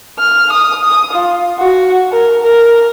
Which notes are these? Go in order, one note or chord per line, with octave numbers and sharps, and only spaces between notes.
F6
D#6
D#6
F4
F#4
A#4
A#4